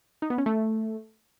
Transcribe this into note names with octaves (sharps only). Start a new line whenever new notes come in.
D#4
B3
C#4
A3